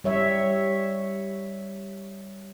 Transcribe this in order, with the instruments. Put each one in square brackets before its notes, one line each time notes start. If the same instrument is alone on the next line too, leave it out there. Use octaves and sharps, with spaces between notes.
[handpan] G3 C#5 E5